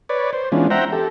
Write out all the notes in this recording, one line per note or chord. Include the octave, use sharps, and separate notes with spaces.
B4 C#5 D5
C5
E3 G#3 B3 C#4 D4 F4
C5 E5 F#5 G5 A#5
G4 A4